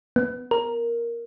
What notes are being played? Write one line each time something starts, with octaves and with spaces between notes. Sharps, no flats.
B3
A#4